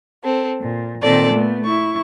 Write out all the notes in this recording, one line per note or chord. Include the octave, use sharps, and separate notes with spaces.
C4 A4
A#2
A#2 D#3 C4 A4 D5
A3 B3
E4 C#6